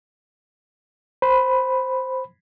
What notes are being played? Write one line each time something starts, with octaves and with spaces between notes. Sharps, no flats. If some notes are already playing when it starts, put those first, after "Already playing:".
C5 B5